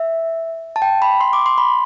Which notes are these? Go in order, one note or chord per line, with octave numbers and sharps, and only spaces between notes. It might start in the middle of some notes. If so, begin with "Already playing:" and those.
Already playing: E5
A5
G5
B5
C6
D6
C6
B5